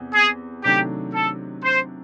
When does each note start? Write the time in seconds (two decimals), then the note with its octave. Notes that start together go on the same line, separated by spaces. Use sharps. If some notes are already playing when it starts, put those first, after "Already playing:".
Already playing: E2 C3
0.14 G#4
0.64 C3 D#3 F#3 A3 D4 G4
1.14 A4
1.64 C5